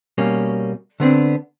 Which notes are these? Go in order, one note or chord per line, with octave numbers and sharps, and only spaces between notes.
B2 G3 A#3 C#4
D3 B3 C4 D4